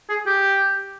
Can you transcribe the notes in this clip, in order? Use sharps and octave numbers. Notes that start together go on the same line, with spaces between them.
G#4
G4